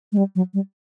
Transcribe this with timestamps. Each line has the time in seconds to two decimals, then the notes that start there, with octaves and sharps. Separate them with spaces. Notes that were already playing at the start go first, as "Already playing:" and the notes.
0.12 G#3
0.17 G3
0.35 F#3
0.54 G3